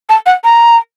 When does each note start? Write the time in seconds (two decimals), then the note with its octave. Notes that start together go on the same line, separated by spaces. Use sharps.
0.09 A5
0.26 F#5
0.44 A#5